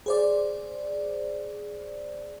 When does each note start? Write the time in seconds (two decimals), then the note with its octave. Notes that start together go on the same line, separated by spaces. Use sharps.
0.06 G#4 C5 D5